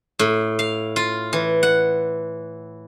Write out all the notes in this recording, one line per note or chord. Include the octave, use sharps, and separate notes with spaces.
A2
F5
F4
E3
F#5